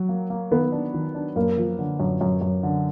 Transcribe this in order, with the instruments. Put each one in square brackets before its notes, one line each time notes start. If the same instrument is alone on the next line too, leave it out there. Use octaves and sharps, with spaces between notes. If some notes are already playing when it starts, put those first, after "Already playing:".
Already playing: [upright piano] F#3
[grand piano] A#3
A#3
[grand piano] D#3 [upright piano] B3
[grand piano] D4
D#3
D4
[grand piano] F#2 [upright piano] A#3
[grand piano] F3
D3
F#2
F#2
F#2
D3